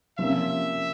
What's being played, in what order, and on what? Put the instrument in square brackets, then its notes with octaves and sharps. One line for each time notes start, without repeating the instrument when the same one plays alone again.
[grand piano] C3 F3 A#3 C#4 [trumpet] E5